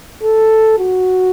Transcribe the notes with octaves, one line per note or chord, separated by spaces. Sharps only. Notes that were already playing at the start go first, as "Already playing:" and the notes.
A4
F#4